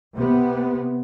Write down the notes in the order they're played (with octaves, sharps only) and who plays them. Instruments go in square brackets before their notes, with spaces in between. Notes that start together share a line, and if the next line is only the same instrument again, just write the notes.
[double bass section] C3 B3